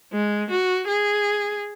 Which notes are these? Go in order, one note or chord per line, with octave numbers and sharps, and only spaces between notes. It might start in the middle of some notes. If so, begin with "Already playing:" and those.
G#3
F#4
G#4